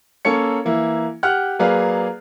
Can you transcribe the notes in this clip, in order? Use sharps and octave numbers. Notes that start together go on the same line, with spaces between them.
A#3 C#4 A4 C#5 C#7
E3 A#3 E4
G4 F#5 F6 F#6
F#3 A#3 G#4 B4 D5 F5